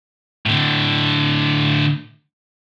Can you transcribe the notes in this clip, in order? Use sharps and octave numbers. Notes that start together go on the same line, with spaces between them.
A2 D3